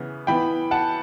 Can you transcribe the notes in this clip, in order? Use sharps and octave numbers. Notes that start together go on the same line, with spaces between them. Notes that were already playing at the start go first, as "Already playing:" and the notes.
Already playing: C#3 E3 B3
E3 B3 G5 B5
F#5 A5